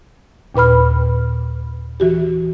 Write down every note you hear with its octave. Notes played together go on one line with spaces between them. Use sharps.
D#2 A#2 B4 B5 F6
E3 F#4 G4